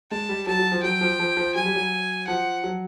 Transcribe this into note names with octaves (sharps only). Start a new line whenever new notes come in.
G#3 A5
G3
F#3 A5
F#3
F3
F#3 G5
F3
F3
F3
F#3 G#5
G3
F#3
F3 F#5
F#3